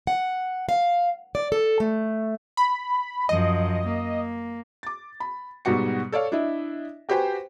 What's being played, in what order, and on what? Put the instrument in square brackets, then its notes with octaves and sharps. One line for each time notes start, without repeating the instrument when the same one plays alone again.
[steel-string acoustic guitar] F#5
F5
D5
A4
A3
[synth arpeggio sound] B5
[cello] F#2 F3 [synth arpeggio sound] D#5
[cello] A#3
[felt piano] D6 A6
B5
G#2 B2 G3 F#4 C#7
A4 C#5 D5 F5
D4 E4 D#5 E5
F#4 G4 B4 C5 G5 G#5